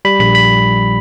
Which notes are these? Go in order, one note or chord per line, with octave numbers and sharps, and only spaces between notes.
G3 B5
A#1 B5
B5